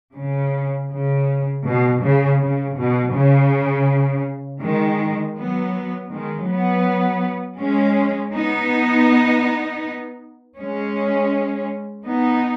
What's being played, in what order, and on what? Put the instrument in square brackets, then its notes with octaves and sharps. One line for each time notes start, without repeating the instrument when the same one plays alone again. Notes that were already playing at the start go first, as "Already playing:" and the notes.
[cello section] C#3
C#3
B2
C#3
C#3
B2
C#3
D#3 G#3
F#3 B3
D#3 G#3
F#3 B3
G#3 C#4
B3 D#4
G#3 C#4
B3 D#4